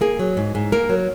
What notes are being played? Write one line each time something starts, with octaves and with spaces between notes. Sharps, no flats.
A#3 G#4
F#3
G#2
G#2
A#3 A#4
F#3